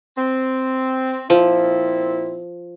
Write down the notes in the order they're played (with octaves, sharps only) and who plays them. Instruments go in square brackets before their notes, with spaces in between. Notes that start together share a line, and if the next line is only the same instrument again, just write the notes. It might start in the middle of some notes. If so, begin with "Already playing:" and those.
[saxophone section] C4
[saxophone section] A#2 C4 E4 [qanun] F3